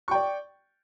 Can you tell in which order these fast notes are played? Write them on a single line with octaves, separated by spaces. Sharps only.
C#6 G5 D5